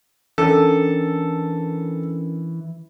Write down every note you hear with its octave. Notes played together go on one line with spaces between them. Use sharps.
E3 C#4 D4 A4 A#4